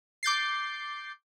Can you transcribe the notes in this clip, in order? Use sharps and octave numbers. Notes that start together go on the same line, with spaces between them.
D6 G6 A6 C7